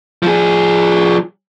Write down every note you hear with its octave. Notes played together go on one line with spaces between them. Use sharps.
F3 G#4